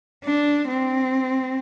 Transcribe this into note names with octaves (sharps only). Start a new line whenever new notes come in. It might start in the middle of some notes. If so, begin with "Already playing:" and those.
D4
C4